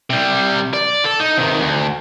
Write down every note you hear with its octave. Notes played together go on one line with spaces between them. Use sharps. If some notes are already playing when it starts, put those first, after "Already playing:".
C3 G3
D5
A4
D#4
C3 D#3
D2